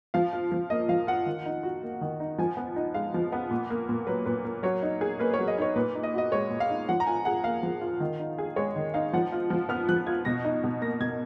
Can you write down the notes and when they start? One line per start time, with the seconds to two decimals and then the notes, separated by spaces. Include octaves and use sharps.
0.14 F3 F5
0.33 F4
0.52 F3
0.70 A#3 D#5
0.89 F3 F5
1.07 F4 F#5
1.26 D#3
1.46 D#4
1.63 F#4
1.83 A#3
2.01 D#3
2.20 D#4
2.38 F3 G#5
2.57 B3
2.76 D#4
2.94 G#3 F5
3.14 F3
3.32 B3
3.51 A#2
3.70 A#3
3.89 A#2
4.07 F#3 B4
4.26 A#2 B4
4.45 A#3
4.63 F#3 C#5
4.83 D#4
5.01 G#4
5.19 A#3 B4
5.34 F#3 C#5
5.48 D#5
5.58 D#4 C#5
5.76 A#2 B4
5.95 D#4
6.03 D#5
6.14 F#4 D#5
6.32 G#3 C#5
6.50 A#2
6.60 F5
6.70 D#4
6.89 F3 F#5
7.00 A#5
7.07 F4 G#5
7.25 G#4 F#5
7.44 A#3 F5
7.63 F3
7.81 F4
8.00 D#3
8.20 D#4
8.38 G#4
8.56 G#3 C#5
8.76 D#3
8.94 D#4 F5
9.13 F3 F#5
9.32 F4
9.50 F3
9.69 B3 F6
9.89 F3 F#6
10.07 F4 G#6
10.25 B2 A#6
10.45 D#4
10.64 B2
10.82 A#3 A#6
11.00 B2 G#6